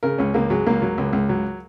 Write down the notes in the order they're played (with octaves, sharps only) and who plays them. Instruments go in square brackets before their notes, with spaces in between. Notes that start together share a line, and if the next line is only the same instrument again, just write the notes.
[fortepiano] C#3 A#4
C#2 C#4
C#2 A#3
F#3 G#3
C#2 A#3
F#3
C#2
C#2
F#3